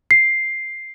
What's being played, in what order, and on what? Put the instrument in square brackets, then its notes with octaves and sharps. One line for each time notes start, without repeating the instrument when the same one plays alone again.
[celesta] C7